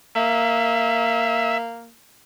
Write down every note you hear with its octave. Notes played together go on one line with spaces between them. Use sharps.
A#3 E5